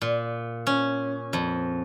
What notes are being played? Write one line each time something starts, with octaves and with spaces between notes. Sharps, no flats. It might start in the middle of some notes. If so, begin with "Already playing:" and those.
A#2
C#4
F2